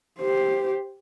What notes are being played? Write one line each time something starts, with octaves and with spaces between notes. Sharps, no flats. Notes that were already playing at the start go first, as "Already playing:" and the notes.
G4 C5